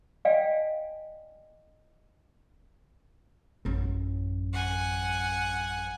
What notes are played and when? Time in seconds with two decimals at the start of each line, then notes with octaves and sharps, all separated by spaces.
0.25 D5 D#5 F5 G5 G#5
3.65 A1 F#2
4.53 F#5 G#5